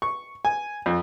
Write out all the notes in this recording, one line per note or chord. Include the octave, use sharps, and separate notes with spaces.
C#6
G#5
F2